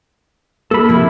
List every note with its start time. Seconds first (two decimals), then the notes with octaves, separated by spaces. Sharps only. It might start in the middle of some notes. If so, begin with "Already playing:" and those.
0.71 A#3 A4 B5
0.89 C3 F3 E4